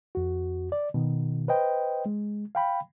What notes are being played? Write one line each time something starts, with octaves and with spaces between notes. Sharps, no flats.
F2 F#4
D5
B2 D#3
B4 C5 D#5 G5
G#3
F5 G5 B5